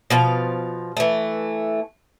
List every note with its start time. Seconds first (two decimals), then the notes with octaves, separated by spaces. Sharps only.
0.10 B2 F3 F5
0.97 E3 A3